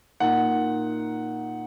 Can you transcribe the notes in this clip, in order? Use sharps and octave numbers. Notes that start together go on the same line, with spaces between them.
A#2 A#3 D#4 F#5